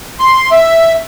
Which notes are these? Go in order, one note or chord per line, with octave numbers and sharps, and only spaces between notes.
C6
E5